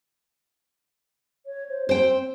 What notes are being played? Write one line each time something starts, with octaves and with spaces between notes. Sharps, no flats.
C#5
C5
C4 C5 G5